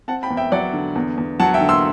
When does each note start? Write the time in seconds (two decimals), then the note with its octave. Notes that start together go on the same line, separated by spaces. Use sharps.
0.08 C4 F#5 A5
0.23 G5 B5
0.30 E2
0.37 E5 G5
0.52 F#3 D5 F#5
0.73 D3
0.95 E2
1.17 E2
1.40 F#3 F#5 A5
1.54 E5 G5
1.61 D3
1.69 C6 E6